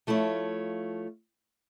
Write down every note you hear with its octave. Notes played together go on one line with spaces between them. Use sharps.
F3 A3 E4 F4 C#5